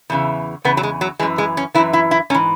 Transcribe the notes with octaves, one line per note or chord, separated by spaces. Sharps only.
E2 C#3 E3
E2 C#3 B3
F#3
G#3
F#3
F#2 E3 G#3
G#3
C#4
F#2 E3 E4
E4
E4
G#2 E3 C#4